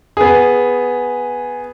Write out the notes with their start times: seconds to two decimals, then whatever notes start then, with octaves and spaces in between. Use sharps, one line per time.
0.17 B3 G#4